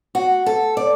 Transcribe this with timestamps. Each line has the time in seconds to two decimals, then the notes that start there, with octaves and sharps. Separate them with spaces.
0.15 F#4
0.46 A4
0.77 D5